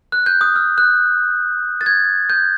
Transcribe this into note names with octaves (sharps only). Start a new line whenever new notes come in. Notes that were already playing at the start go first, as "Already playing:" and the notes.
F#6
G6
D#6
F6
F#6
A6
G#6
G6